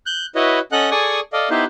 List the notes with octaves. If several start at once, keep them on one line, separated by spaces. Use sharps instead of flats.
F#6 G6
E4 F#4 B4 C#5 D#5
C#4 A4 D#5 F#5 F#6
G#4 A4 D5 G#5 C#6 D#6
A4 D5 D#5 F5
B3 D#4 E4 G4 B4 C5